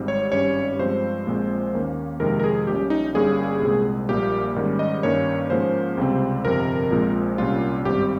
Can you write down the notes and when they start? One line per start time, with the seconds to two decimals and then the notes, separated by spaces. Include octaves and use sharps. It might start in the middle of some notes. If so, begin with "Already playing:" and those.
Already playing: G#1 G#2 G3 C4
0.08 C#5
0.32 G#1 G2 G3 C#4 C#5
0.79 G2 F3 G#3 C4 C5
1.26 A#1 A#2 G#3 C4
1.73 D#2 D#3 A#3 C#4
2.20 F2 C3 D#3 G#3 C4 A#4
2.40 A#4
2.44 G#4
2.67 A#1 A#2 G3 C#4 G4
2.90 D#4
3.14 G1 G2 G3 A#3 C#4 G#4
3.62 C2 A#2 G#3 C4
4.08 A#1 A#2 G3 A#3 G4
4.56 G#2 D#3 G3 C#4
4.79 D#5
5.03 G2 D#3 A#3 C#4 C#5
5.50 G#2 F3 A#3 C#4 C5
5.97 C#2 C3 G3 C4
6.45 G1 F2 C3 A#4
6.91 A#1 A#2 F3 G#3 C4
7.38 C2 A#2 G3 A#3 C#4 F4
7.85 G#1 G2 G3 C4 G4